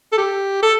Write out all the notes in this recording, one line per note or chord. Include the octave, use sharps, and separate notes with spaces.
A4
G4
A4